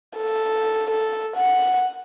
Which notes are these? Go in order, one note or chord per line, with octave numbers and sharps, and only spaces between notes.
A4
A4
F#5